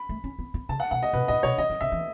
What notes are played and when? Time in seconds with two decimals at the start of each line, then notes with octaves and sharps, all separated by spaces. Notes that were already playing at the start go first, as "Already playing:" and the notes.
Already playing: B5
0.09 A3
0.24 C#4
0.39 B3
0.54 B3
0.69 C#3 A5
0.80 F#5
0.91 B2 F#5
1.03 D#5
1.13 B2 B4
1.28 A2 D#5
1.43 B2 C#5
1.58 D#3 D#5
1.70 D#3
1.81 C#3 E5
1.92 E3